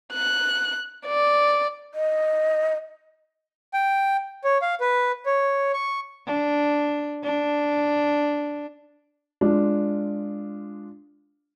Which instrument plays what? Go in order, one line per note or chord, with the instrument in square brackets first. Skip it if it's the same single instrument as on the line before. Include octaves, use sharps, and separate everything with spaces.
[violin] F#6
D5
[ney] D#5
[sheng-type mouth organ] G5
C#5
F5
B4
C#5
C#6
[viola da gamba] D4
D4
[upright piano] G#3 D4 F4